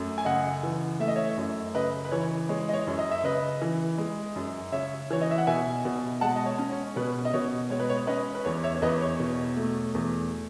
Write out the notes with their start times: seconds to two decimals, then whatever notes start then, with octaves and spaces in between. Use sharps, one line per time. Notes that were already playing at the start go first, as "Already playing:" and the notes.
Already playing: F#2 A3
0.18 G#5
0.25 C#3 D#5 F#5
0.63 E3
1.00 A3 E5
1.08 D#5
1.16 C#5 E5
1.37 F#2
1.75 C#3 B4 D#5
2.05 B4
2.12 E3 C#5
2.49 G#3 C#5
2.69 D#5
2.73 C#5
2.87 F#2
2.99 D#5
3.11 E5
3.24 C#3 B4 D#5
3.61 E3
3.98 G#3
4.36 F#2
4.72 C#3 C#5 E5
5.11 E3 C#5
5.21 D#5
5.31 E5
5.38 F#5
5.47 B2 E5 G#5
5.85 B2
6.21 G#3 F#5 A5
6.35 D#5
6.46 C#5
6.59 C#4
6.71 C#5
6.96 B2 B4
7.25 D#5
7.33 B2 C#5
7.70 G#3 C#5
7.80 B4
7.89 C#5
8.07 C#4 B4 D#5
8.35 B4
8.45 E2 C#5
8.63 C#5 E5
8.76 C#5
8.82 E2 B4 D#5
9.01 C#5
9.20 B2
9.57 A3
9.95 E2